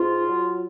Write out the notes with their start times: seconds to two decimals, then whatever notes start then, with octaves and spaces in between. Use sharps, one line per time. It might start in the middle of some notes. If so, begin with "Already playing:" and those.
Already playing: G#2 F4
0.28 F#3